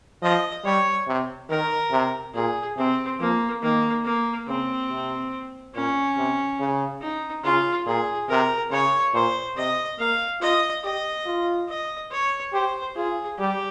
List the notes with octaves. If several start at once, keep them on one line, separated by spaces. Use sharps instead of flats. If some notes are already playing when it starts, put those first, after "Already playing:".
F3 D#5
G3 C#5
C3
D#3 A#4
C3
A#2 G#4
C3 C4
F3 A#3
D#3 A#3
A#3
C#3 C4
C3
A#2 C#4
C3
C#3
D#4
C#3 F4
A#2 G#4
C3 A#4
C#3 C#5
A#2 C5
C3 D#5
A#3 F5
F4 D#5
G4 D#5
F4
D#5
C#5
G4 C5
F4 G#4
G3 G4